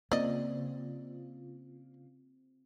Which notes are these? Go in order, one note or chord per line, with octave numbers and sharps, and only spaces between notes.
C#3 A#3 C4 F4 D5 D#5